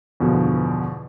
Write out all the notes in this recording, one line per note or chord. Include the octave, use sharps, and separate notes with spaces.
E2 G2 B2 D3 F3